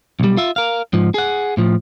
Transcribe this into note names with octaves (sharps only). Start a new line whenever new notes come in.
B1 G3
F4 E5
A#4 F5
G#2 F3
G#4 F#5
A2 F3